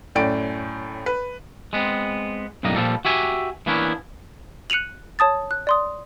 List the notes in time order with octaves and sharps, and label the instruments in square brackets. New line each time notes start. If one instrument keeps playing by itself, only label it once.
[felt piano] F#2 A2 D5 G5 D7
B4
[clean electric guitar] G#3 B3 C4
B1 F#2 A2 G3 A#3 D#5
A#2 F3 G3 A4
F#4 G4 E5 G#5
E3 A#3 B3 C#4 D4 E4
[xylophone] F#6 C#7 D#7 F7 F#7
C#5 A5 D#6 A6
F#6
D5 C6 D#6